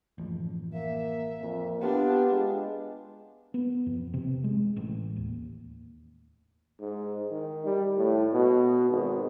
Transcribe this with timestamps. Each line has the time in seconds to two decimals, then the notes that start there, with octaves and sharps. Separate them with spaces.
0.18 A1 F#2 F3
0.74 A#3 E5
1.41 F2 A#3
1.82 B3 D4 F4 G4
2.31 G#3
3.54 B3
3.86 F2
4.14 C3
4.44 G#3
4.76 A1
5.16 D#2
6.80 G#2
7.31 D#3
7.65 G3
7.97 A2
8.33 B2
8.89 G#1